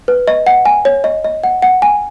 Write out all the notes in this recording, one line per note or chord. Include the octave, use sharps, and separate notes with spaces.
B4
D#5
F#5
G#5
C#5
D#5
D#5
F#5
F#5
G#5